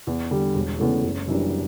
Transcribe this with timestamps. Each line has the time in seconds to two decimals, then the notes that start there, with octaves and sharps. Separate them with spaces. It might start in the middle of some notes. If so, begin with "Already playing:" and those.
0.07 E2
0.30 D3 G3
0.55 E1
0.79 E2 C#3 E3 A3
1.04 F#1
1.28 F#2 E3 G3 D4